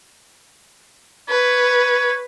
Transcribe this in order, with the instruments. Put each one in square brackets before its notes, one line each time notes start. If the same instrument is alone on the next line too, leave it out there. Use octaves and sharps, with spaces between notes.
[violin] B4 [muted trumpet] C#5